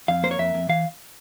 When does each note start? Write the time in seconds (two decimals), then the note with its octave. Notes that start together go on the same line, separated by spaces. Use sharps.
0.08 F2 F5
0.23 A#3 C5
0.31 C#5
0.39 F2 E5
0.54 F2
0.69 E3 F5